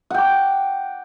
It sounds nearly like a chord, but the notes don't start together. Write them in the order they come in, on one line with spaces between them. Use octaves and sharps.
F#5 G5 D6